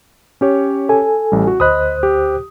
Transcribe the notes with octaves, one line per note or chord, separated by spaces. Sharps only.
C#4 G4 C#5
A4 G#5
A1 G3
F#4
D2 C5 D#5 B5 D#6 F#6
G4